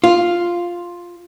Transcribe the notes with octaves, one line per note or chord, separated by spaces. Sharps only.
F4